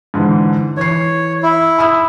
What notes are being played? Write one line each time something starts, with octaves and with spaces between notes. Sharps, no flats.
G#2 D3 E3
E3 C#5 C7
E4
B5 D#6 E6